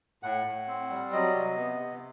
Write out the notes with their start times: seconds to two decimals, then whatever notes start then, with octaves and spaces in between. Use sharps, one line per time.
0.23 A2 F#5
0.46 A2
0.67 C4
0.90 G3
1.12 F#3 D#5
1.35 C3
1.56 B3
1.79 C3